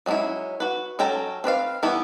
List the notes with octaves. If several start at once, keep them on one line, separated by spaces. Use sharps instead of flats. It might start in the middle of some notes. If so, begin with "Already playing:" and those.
F#3 G#3 C4 C#4 E4
F#4 B4
F#3 C#4 A4 G5 A#5
C4 B4 D5 F5
E3 G3 B3 E4